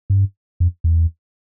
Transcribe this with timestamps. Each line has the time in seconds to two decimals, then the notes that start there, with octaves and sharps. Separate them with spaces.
0.10 G2
0.60 F2
0.84 E2